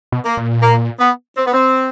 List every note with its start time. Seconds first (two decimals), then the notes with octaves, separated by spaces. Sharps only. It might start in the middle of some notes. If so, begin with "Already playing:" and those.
0.12 B2
0.25 A#3
0.37 A#2
0.62 A#3
1.00 B3
1.37 C4
1.47 B3
1.53 C4